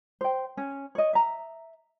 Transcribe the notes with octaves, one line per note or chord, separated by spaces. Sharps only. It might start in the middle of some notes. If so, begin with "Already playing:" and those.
C5 G5
C#4
C#5 D#5
E5 A#5